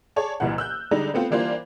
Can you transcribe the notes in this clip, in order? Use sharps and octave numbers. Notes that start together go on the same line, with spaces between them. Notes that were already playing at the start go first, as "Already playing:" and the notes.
G#4 C#5 D5 A5
F#1 C2 A#2 E3 F#5
E6 F#6 G6
D3 G3 G#3 D4 D#4
A3 B3 C4 F4
E3 G3 A#3 D4 F4 C5